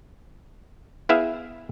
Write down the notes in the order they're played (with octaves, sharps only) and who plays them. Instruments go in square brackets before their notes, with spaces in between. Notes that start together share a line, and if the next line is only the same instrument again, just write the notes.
[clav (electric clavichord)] B3 E4 G#4 E5 F5